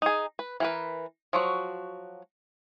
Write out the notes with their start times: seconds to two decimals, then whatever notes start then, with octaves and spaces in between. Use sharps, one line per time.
0.02 D#4 G#4
0.39 B4
0.60 E3 A#4 B4
1.33 F3 F#3 F#4